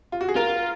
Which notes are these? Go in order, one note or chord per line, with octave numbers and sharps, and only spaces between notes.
F4
F#4
G#4
F4 A#4